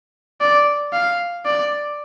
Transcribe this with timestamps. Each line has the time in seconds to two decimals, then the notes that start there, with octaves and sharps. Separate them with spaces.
0.41 D5
0.93 F5
1.45 D5